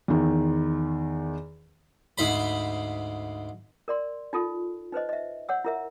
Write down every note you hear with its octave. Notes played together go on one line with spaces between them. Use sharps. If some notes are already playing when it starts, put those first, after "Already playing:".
E2 D#3
D2 G#2 C5 B5
A#4 D5 C6
D#4 F4 A4
D#4 B4 C5 D#5
D#5 E5
C#5 F#5 E6
E4 A#4 E5